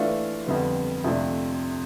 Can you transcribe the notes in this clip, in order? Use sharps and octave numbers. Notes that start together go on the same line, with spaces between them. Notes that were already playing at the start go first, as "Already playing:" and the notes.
Already playing: E3 A3 D4 F4
F2 D3 G3 B3
F2 C3 F3 A3 D4